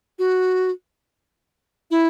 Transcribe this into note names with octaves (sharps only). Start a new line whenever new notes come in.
F#4
E4